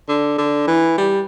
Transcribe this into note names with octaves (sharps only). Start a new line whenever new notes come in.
D3
D3
E3
G3